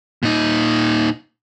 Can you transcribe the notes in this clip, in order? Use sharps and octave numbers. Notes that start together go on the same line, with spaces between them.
A#2 D#4